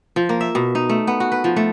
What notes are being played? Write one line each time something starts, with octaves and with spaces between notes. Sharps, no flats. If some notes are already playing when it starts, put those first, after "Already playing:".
F3
A#3
E5
B2
D#4
A3
B3
F#4
B4
F3
A3